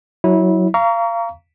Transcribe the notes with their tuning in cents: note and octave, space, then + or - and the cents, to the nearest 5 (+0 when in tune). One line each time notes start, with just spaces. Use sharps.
F#3 +0 E4 -25
F5 -25 A#5 +0 C#6 +35